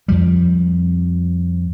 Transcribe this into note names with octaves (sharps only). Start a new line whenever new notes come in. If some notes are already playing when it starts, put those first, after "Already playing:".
F2 F3 G3